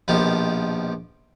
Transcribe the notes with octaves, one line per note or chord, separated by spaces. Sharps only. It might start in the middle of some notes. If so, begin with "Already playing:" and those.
A#1 B2 D#3 F3 G4